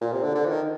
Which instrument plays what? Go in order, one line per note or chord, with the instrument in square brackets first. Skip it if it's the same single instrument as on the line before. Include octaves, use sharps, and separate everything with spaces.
[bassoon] A#2
C3
D3
D3
F3
D#3